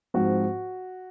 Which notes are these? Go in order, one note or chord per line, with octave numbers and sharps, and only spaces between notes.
G#2 F3 C4 F#4